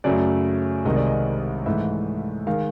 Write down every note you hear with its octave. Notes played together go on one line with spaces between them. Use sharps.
F#2 C#3 F#3 A3 D5
C2 C3 D#3 G#3 C4 D#5
D5
D#5
G#2 E3 A3 E5
D#3 G#3 F5